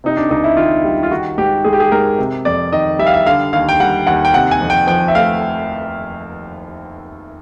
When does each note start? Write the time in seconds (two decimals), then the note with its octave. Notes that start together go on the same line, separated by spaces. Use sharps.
0.04 C3 D#4
0.17 D4
0.30 C#2 D#4
0.44 E4
0.57 D#3 F4
0.84 G3
1.03 F4
1.11 D#3 F#4
1.38 G#2 G4
1.64 G#3 G#4
1.73 G4
1.80 G#4
1.92 G#2 A#4
2.18 C3
2.45 F2 D5
2.73 D#3 D#5
2.99 G3 E5
3.06 F5
3.14 E5
3.27 D3 F5
3.53 D#2 F5
3.69 G5
3.80 G3 F#5
4.07 D#2 F#5
4.25 G5
4.33 C3 F#5
4.51 G#5
4.61 F2
4.70 G5
4.87 F3 G5
5.08 E5
5.15 A3 F5